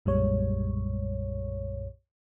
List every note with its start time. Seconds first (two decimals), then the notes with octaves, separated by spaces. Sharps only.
0.05 B1 F#2 A#2 G3 G#3 C#5